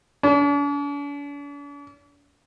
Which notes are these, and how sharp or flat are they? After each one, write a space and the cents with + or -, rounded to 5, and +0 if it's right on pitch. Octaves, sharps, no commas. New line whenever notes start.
D4 -45